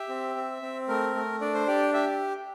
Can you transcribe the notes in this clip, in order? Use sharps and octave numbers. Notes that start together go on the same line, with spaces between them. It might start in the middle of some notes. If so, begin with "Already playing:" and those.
Already playing: G4 E5
C4
C4
C4
A3 A#4
A3
D4 D5
C5
G4 D5
G4 E5